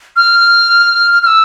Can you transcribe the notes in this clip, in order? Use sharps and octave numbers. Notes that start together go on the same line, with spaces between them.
F6
F6
E6